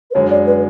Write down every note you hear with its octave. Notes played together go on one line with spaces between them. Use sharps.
B4
F#2 D3 G#3 C#5
D5
B4